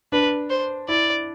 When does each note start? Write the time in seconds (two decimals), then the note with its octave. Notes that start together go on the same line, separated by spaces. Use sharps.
0.12 D4 B4
0.50 C5
0.89 E4 D5